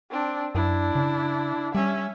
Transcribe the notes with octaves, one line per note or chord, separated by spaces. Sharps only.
C4 D4
F#2 D4 E4
C#3
G3 C#4 E5